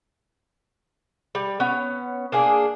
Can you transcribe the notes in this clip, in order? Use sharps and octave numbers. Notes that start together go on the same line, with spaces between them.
G3
B3 C#4
A#3 D4 G#4